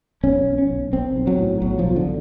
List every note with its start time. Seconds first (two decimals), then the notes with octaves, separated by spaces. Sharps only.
0.23 B1 C#4
0.47 B1
0.58 C#4
0.70 B1
0.93 B1 C4
1.16 B1
1.27 F#3
1.38 A2
1.62 B1 F#3
1.79 F3
1.85 B1
1.96 D3